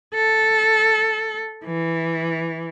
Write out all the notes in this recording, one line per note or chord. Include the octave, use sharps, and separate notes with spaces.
A4
E3